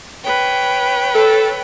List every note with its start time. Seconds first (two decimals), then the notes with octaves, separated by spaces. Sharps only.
0.23 B4 C#5 G5
1.14 A4